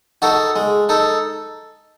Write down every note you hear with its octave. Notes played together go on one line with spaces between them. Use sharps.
D#4 F#4 A4
G#3
D#4 A4